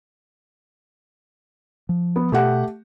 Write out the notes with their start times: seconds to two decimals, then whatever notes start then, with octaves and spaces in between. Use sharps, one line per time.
1.89 F3
2.16 B3
2.32 B2 A3 G4 F#5